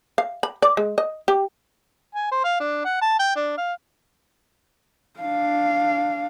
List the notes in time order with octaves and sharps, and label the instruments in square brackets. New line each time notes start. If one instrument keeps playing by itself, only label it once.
[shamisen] F5
B5
D5
G#3
D#5
G4
[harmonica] G#5
C5
F5
D4
F#5
A5
G5
D4
F5
[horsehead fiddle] D4 F5